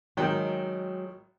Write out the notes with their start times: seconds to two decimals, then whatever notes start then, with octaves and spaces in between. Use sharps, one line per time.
0.17 G#1 D#3 F#3 G#3 G5